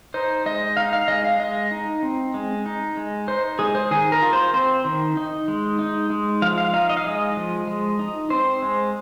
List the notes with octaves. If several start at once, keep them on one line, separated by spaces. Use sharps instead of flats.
D#4 C5
G#3 D#5
D#4 F5
F5
G#3 D#5
F5
G#3 D#5
D#4
C4
G#3
D#4
G#3
D#4 C5
G#3 G#4
C5
D#3 G#4
A#4
F4
C5
C4 C5
D#3
D#4
G#3
D#4
G#3
F3 F5
F5
D#4 F5
D#5
F5
G#3 D#5
F3
G#3
D#4
C4 C5
G#3